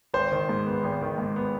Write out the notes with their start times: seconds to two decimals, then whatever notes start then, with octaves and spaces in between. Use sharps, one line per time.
0.14 G#1 C5
0.32 D#3
0.49 G#2
0.67 B3
0.83 G#1
1.02 D#3
1.18 G#2
1.36 B3